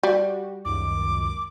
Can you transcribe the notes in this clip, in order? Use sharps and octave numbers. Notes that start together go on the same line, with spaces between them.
G3 F#4 G4
C#2 F#2 D#3 D6